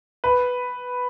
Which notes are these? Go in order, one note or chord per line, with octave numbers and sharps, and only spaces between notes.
B4